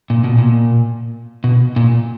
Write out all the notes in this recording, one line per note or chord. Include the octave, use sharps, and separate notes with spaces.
A#2
B2
A#2
B2
A#2